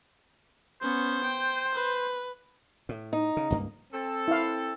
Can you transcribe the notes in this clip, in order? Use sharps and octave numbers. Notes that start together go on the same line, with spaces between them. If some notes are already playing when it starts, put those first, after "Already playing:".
B3 C#4 C5
G5
B4
A2
D#4
C#3
C#2 G2 A#3
C4 A4
E4 F5